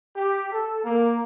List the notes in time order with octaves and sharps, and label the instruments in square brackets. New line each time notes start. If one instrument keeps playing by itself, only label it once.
[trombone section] G4
A4
A#3